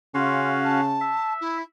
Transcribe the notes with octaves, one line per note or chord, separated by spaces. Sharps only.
C#3 C#4 F#4 F5 C6
A5
E5
E4